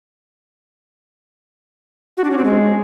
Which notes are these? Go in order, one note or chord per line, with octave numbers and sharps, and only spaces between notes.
F#4
D4
C#4
C4
G#3